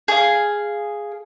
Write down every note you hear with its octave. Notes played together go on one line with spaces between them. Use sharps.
G#4 F5